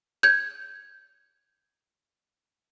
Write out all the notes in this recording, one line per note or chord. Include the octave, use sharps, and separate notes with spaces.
G6 G#6